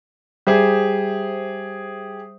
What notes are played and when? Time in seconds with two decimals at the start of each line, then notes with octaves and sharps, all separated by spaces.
0.47 G3 G4 G#4 C5 E5